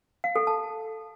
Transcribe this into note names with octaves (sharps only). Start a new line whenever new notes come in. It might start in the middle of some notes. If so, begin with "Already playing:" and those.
F5
A4
A5